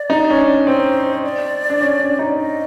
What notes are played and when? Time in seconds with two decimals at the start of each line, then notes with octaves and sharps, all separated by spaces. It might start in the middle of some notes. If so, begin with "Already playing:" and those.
Already playing: D5
0.10 D#4
0.30 C#4
0.38 D4
0.66 C4 C5
1.23 D5
1.70 D4
1.81 C#4
2.00 D4
2.19 D#4
2.38 D#5